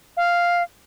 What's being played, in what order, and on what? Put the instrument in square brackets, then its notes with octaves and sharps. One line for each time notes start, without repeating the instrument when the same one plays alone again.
[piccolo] F5